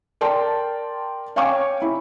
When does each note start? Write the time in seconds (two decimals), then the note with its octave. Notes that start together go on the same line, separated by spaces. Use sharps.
0.21 A#4 D5 G5 A5 C6
1.36 C#5 F5 G5 G#5 C#6 D6
1.82 E4